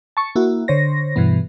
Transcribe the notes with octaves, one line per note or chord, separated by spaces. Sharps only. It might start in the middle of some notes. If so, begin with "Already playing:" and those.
A5 C#6
A#3 E4 F#4
D3 C5 C#5 A#6
G2 B2 E3 B3